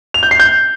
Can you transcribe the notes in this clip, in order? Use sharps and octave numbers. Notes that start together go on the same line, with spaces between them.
F7
G6
C7
G6